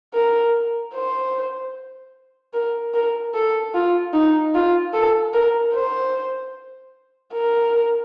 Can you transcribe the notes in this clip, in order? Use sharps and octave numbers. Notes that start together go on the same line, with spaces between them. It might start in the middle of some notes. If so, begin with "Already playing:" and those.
A#4
C5
A#4
A#4
A4
F4
D#4
F4
A4
A#4
C5
A#4